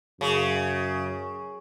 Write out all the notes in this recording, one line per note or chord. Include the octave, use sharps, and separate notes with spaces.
F#2 C#3